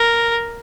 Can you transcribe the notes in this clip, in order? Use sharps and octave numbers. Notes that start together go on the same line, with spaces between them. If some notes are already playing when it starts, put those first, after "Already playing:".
Already playing: A#4